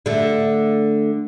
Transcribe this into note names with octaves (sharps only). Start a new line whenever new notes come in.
D3 A3